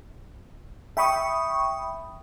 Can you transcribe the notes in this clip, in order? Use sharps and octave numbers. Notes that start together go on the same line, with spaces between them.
E5 G5 B5 C#6 D#6